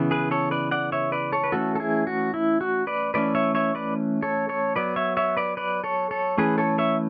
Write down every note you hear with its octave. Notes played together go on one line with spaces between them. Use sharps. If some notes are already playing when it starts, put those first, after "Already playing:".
Already playing: C#3 E3 B3
G#4 B4
A4 C#5
B4 D5
D5 F#5
C#5 E5
B4 D5
A4 C#5
B4
E3 A3 C#4 F#4 A4
A4
E4 G#4
F#4
E4
F#4
B4 D5
E3 A3 C#4 B4 D5
C#5 E5
C#5 E5
B4 D5
A4 C#5
A4 C#5
F#3 B3 B4 D5
C#5 E5
C#5 E5
B4 D5
B4 D5
A4 C#5
A4 C#5
E3 A3 C#4 G#4 B4
A4 C#5
C#5 E5